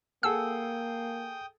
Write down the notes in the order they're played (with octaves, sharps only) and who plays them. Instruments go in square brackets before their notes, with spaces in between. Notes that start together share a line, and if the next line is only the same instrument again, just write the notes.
[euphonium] A#3 [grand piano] G#4 A4 F#5 [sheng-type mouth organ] G5 D#6 [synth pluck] E6